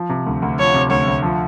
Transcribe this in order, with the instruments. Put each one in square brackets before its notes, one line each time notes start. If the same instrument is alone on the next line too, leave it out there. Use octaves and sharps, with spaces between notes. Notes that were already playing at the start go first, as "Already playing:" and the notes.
Already playing: [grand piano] F3
C3
D2
D2
[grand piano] F3 [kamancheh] C#5
[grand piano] C3
[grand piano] D2 [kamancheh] C#5
[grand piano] D2
F3